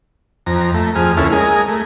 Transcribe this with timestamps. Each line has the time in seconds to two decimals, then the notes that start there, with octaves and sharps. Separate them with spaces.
0.46 F2 A#5
0.74 A3
0.95 F2 G#4 F6
1.17 D2 A#3 C#4 E4 A4 F6
1.32 G#3 G#4 A#4
1.68 A3